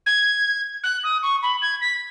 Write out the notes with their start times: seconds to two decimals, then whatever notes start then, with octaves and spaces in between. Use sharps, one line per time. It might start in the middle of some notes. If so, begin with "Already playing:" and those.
0.06 G#6
0.84 F#6
1.04 D#6
1.23 C#6
1.43 B5
1.62 G#6
1.81 B6